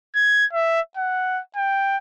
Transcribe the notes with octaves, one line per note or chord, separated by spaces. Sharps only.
G#6
E5
F#5
G5